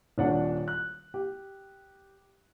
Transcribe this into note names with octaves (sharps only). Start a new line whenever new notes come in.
D#1 D#3 D4 C#5 F#5
F#6
G4